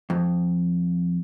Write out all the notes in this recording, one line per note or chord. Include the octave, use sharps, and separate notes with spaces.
F2